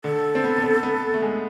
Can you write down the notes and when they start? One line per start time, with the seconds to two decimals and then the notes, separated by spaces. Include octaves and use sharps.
0.04 D3 A4
0.35 C4
0.44 B3
0.58 B3
0.64 C4
0.83 B3
1.14 A3
1.22 G#3